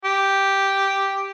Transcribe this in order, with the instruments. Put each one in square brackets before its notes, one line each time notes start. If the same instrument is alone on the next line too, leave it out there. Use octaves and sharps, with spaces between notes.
[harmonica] G4